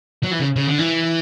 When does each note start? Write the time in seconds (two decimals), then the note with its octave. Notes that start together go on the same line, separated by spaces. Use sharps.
0.23 F#3
0.31 E3
0.40 C#3
0.56 C#3
0.67 D3
0.78 E3